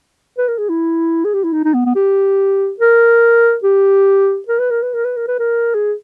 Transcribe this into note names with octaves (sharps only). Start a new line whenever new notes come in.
B4
A#4
G#4
E4
G#4
G4
E4
D#4
D#4
B3
B3
G4
A#4
G4
A#4
B4
A#4
B4
A#4
B4
A#4
B4
A#4
G#4